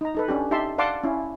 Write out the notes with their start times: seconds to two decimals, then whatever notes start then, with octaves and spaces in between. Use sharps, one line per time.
0.01 D#4 A#5
0.15 D#4 A4 B4
0.28 C#4 D4 G4
0.51 D#4 G4 E5 A5 C6
0.78 D5 F5 F#5 A5 C6 D6
1.04 C#4 E4